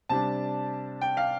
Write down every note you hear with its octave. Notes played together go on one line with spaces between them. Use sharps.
C3 G3 D4 A5
G5
F5